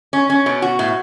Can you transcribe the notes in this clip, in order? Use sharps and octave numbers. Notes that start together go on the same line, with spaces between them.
C#4
C#4
B2
F#4
A2